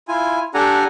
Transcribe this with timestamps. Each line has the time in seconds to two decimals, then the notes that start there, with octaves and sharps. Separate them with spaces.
0.08 E4 F4 G#5
0.54 D4 G4 A4 F#5 G#5 A#5